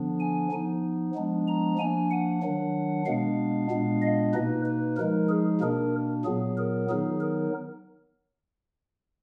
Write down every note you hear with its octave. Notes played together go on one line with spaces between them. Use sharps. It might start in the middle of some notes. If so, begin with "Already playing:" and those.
Already playing: D3 F3 B3 D4
G#5
F3 B3 D#4
F3 G#3 B3 D4
A#5
F3 A#3 D4 G#5
F#5
D#3 F#3 D4
B2 G#3 B3 D4 F5
A#2 G#3 B3 D4
D#5
B2 A#3 D#4 B4
B4
F3 G#3 D#4 A#4
G#4
B2 A#3 D4 A#4
A#2 F#3 B3 G#4
A#4
D#3 F#3 B3 D#4 G#4
A#4